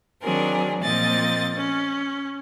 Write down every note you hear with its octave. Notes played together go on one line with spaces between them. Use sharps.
D#3 F#3 C4 D4 G#4 A#4
A#2 F3 A#3 C4 D#5 A6
C#4